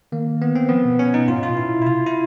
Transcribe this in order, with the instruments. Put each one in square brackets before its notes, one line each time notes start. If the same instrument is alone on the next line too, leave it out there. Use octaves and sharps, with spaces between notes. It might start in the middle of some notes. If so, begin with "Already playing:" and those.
[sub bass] D#3 [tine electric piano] A#3
[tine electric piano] B3
C4
[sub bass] F3 [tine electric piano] B3
[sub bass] B2
[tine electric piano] C#4
D#4
[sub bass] A2 [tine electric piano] F4
[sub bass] A2
[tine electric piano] F4
[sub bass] B2
[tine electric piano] E4
E4
[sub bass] C3 [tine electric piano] F4
[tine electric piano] E4